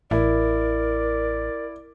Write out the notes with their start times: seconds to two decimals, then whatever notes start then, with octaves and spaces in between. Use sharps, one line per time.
0.11 A1 E4 A#4 D5